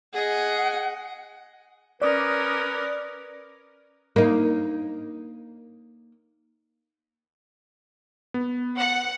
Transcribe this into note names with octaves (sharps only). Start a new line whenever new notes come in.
G#4 D#5 F#5
C#4 A#4 B4 D5 D6 D#6
A#3 D#4
B3
F#5